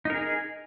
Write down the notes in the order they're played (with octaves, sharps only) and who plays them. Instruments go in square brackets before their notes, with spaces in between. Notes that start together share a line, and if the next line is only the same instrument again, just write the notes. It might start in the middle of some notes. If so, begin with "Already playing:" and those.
[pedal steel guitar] D#4
A#4
G#4